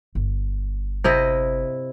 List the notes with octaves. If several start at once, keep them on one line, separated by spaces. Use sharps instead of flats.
G1
C3 E4 D#5